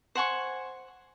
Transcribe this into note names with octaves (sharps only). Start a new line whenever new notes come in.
C5 F#5 G#5 C#6